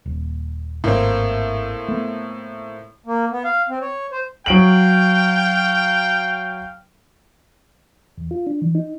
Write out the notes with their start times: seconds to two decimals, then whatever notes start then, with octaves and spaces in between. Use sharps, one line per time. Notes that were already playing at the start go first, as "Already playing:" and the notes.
0.06 D#1
0.84 G#1 A2 A#3 C4
1.88 A3 B3
3.05 A#3
3.31 B3
3.44 F5
3.69 C4
3.81 C#5
4.11 C5
4.46 F#3 F5 G5 D7 F#7
8.18 E2
8.31 F4
8.47 D4
8.62 E3
8.75 D#4